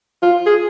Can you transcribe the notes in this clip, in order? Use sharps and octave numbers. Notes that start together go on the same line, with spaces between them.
F4
G#4